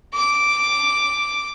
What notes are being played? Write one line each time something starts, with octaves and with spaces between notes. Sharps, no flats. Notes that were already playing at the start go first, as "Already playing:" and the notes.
D6